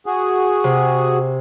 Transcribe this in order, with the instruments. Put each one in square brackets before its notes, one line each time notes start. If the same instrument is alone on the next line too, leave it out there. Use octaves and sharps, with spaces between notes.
[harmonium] F#4 G#4
[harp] C3